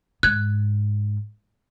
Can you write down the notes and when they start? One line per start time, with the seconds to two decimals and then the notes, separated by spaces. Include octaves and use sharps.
0.23 G#2 F#6 G#6